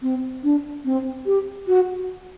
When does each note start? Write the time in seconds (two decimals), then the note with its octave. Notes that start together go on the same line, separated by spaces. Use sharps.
0.02 C4
0.43 D4
0.85 C4
1.26 G4
1.67 F#4